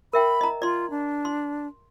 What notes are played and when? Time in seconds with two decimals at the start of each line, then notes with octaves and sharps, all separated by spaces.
0.13 A#4 E5 G5 B5
0.41 D#5 A#5
0.62 F4 D5 C6
0.90 D4
1.25 C6